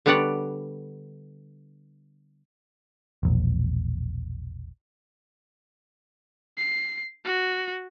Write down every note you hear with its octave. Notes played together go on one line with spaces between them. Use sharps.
D3 G3 B3 C#5 D5 F#5
E1 A#1
C7
F#4